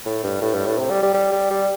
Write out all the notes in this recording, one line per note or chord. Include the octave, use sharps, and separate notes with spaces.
A2
G2
A2
G2
A2
C3
G3
G3
G3
G3
G3